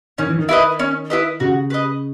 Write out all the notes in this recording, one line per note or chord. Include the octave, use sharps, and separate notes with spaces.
D#3 C#4
E3
D#3
E4 B4 D#5
C#4
E4 B4 D#5
C#3 F#4
B4 D#5